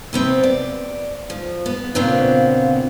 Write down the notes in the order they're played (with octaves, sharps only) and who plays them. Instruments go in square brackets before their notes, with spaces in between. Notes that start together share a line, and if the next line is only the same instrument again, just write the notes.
[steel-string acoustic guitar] C3 B3 C4
D5
F3
B3
A#2 C#3 B3 C4 D4 F4